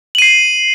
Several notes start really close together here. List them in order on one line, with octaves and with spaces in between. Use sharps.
F#7 D#7 C7